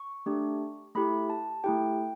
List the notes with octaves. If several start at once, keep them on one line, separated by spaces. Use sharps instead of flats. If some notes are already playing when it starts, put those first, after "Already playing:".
Already playing: C#6
A3 D4 G4
A3 E4 G4 B5
A5
A3 E4 G4 G5